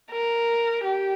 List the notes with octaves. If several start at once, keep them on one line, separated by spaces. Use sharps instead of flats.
A#4
G4